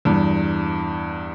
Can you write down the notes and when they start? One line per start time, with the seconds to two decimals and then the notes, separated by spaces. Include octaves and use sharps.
0.05 E2 G2